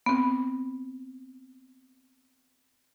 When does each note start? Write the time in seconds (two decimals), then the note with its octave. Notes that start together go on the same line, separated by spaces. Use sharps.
0.06 B3 C4